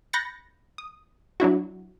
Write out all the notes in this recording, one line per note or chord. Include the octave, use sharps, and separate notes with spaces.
B5 F#6 G6 A6 A#6 C#7
D#6
F#3 D4 E4 F#4